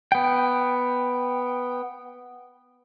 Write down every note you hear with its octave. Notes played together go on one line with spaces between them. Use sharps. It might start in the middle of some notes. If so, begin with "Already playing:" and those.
B3 G5